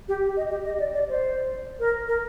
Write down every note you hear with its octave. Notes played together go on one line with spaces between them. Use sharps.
G4
D#5
G4
D#5
D5
D5
C5
A#4
A#4